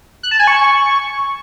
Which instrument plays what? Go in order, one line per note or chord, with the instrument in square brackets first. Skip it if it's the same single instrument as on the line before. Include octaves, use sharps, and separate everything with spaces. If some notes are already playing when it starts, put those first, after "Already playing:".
[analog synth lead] F#6
A5
G#5
C#6